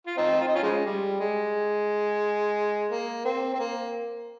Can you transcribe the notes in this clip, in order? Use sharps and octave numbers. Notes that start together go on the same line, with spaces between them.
F4
C4 D#4
F4
D#4
C#4 F4
C#3 F3 G#3
G3
G#3
A#3
C4
C4
A#3